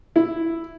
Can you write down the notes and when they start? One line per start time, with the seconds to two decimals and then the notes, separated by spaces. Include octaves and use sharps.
0.16 E4